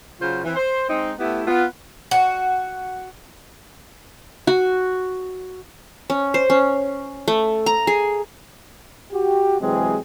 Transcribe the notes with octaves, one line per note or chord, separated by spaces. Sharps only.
C#3 F#3 F4 C5
E3 C4
C5
G#3 C4 D#4
A3 B3 E4 G4
B3 F4
F#4
F#4
C#4
C5
C#4
A3
A#5
G#4
F#4 G4
C3 E3 F#3 G#3 C4 G#4